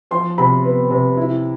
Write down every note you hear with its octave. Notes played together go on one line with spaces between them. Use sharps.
F3 C6
C3 B5
B3
C3
E4